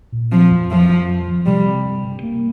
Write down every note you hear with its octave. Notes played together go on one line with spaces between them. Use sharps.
A#2
F3 C4
F2
F2 F3
F2
F3
F3
C3 G3
C3
G2
G2
A#3